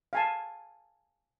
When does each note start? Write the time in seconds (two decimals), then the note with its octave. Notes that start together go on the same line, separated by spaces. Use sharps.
0.13 F5 G#5 A5